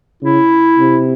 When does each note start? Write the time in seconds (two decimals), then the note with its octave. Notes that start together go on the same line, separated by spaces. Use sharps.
0.22 C#3 E4
0.78 C3